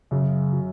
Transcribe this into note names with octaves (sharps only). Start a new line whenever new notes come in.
F#2 C#3
F#3